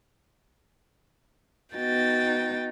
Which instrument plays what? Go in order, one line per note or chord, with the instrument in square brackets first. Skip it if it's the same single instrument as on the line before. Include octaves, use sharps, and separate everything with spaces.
[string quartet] B3 D#4 F#4 G5 A6